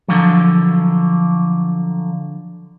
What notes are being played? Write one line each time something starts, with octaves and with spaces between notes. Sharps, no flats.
D3 F3 F#3